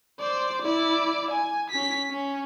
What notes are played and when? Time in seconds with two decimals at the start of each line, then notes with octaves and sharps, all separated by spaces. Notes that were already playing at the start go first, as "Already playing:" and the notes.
0.20 C5 D5
0.62 E4 D5
1.31 G#5
1.70 C#4 B6
2.10 C#4